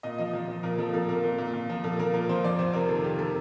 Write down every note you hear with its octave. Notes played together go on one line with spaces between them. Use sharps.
A#2 D#5
F3 D#5
F3
F3
A#2 A#4
F3 A4
A#2 A4
A#2 A#4
A#2
A#2
A#2
F3
A#2 A4
F3 A#4
A#2 A#4
F3 C5
F2 D5
F2 C5
C3 A#4
D#3 A4
D#3 G4
D#3 A4